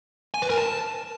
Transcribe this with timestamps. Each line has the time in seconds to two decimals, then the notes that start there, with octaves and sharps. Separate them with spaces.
0.34 G#5
0.42 B4
0.50 A#4
0.58 A5